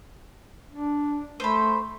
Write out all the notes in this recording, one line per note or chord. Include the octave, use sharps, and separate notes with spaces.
D4
A3 C5 B5